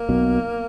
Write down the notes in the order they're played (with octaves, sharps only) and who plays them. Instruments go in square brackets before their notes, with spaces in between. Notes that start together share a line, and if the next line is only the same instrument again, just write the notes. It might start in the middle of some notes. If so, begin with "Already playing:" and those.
Already playing: [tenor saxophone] A#3
[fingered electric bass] B1 B2